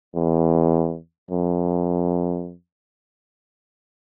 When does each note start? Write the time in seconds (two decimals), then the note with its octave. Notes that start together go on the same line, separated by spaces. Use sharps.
0.15 E2
1.31 F2